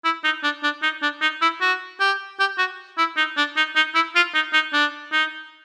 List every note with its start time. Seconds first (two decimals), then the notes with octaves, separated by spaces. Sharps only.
0.04 E4
0.24 D#4
0.43 D4
0.63 D4
0.83 D#4
1.02 D4
1.21 D#4
1.42 E4
1.61 F#4
2.00 G4
2.39 G4
2.58 F#4
2.98 E4
3.17 D#4
3.37 D4
3.56 D#4
3.76 D#4
3.95 E4
4.15 F4
4.34 D#4
4.53 D#4
4.73 D4
5.12 D#4